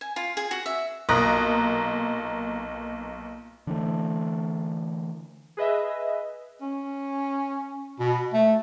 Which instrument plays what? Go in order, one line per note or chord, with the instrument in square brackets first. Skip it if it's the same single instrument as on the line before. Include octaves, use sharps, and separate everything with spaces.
[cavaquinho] G#5
F4
G#4
F#4
E5
[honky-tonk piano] B1 A#2 A#4 D#6 F#6 A#6
[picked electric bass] D3 E3 A3
[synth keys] G#4 B4 D#5 E5
[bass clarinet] C#4
B2
A3